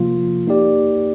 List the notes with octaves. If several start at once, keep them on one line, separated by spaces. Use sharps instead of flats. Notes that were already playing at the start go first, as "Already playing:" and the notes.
Already playing: C3 F3 A#3 F4
A#3 D#4 G4 D5